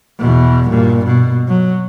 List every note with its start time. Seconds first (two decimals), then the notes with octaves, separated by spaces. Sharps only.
0.19 E2 B2
0.69 G2 A#2
1.05 B2
1.49 F#3